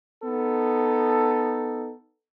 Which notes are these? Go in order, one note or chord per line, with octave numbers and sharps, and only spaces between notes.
B3 D#4 A4